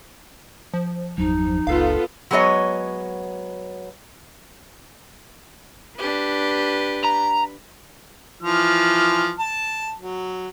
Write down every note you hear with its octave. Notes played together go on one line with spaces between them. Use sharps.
F3
G1 E2 F#3 D#4
F#1 C#2 B3 F4 A4 F5
F#3 G#3 B3 C#5 D#5
D4 G4 B4
A#5
E3 F3 F6
A5
F#3